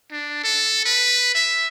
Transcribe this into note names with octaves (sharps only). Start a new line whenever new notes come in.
D4
A4
B4
E5